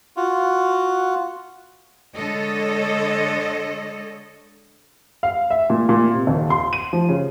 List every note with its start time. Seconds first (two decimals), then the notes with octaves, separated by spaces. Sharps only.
0.17 F4 F#4
2.14 D3 G#3 A4 C#5 D#5
5.23 F5
5.50 E5
5.70 A#2
5.89 A#2
6.14 C3
6.27 D#1
6.50 C6
6.73 D#7
6.93 F3
7.09 C#3